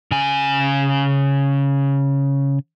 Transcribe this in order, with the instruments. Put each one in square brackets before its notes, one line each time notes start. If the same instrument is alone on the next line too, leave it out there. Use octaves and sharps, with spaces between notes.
[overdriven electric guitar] C#3 G#5